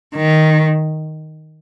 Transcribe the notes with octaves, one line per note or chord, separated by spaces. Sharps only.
D#3